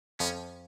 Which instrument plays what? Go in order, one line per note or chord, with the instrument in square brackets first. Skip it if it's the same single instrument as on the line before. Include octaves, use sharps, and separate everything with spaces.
[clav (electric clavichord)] F2 F3 [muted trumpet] C#4